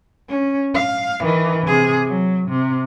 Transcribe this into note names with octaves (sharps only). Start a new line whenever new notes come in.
C#4
F5
D#3 E3
C3 G#4
F#3
C3